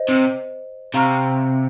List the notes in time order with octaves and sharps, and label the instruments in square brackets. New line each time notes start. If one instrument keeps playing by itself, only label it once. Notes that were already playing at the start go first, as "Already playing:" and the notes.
Already playing: [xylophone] C5 D#5
[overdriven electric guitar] C3
[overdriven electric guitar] C3 [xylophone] F5 A#5 C#6 F6